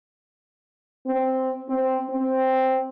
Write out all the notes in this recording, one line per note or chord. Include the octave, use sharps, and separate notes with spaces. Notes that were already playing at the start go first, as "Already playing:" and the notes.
C4
C4
C4